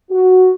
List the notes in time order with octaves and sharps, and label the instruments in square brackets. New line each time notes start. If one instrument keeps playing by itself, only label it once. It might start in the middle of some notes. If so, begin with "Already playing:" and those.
[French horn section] F#4